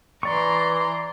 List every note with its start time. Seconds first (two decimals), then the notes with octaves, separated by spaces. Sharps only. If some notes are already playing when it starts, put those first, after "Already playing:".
0.23 E3 D5 A#5 C6 C#6